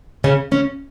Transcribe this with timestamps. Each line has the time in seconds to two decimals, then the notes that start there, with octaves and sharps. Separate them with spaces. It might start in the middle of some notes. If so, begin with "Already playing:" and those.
0.24 C#3 C#4
0.52 C#3 C#4